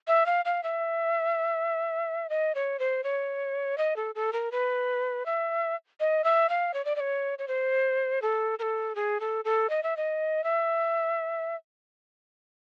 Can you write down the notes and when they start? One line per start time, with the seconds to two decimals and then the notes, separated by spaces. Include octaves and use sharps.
0.08 E5
0.26 F5
0.45 F5
0.63 E5
2.30 D#5
2.55 C#5
2.79 C5
3.04 C#5
3.78 D#5
3.96 A4
4.15 A4
4.33 A#4
4.52 B4
5.26 E5
6.00 D#5
6.24 E5
6.49 F5
6.74 C#5
6.85 D5
6.96 D5
7.00 C#5
7.39 C#5
7.48 C5
8.22 A4
8.59 A#4
8.62 A4
8.95 G#4
9.20 A4
9.45 A4
9.70 D#5
9.83 E5
9.97 D#5
10.44 E5